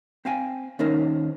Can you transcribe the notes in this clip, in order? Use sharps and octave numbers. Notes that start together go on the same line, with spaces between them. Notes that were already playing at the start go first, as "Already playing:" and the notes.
C4 C5 F5 G5 G#5
D#2 C#4 D#4 A#4 C5